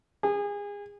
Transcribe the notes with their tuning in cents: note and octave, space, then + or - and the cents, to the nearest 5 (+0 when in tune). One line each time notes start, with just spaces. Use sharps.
G#4 -30